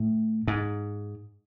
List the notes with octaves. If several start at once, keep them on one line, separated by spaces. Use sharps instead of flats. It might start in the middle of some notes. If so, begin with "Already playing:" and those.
Already playing: A2
G#2